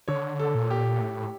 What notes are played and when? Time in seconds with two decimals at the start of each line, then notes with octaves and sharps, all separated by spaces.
0.08 D3 C#5
0.39 A4
0.55 A#2
0.71 G4
1.01 A2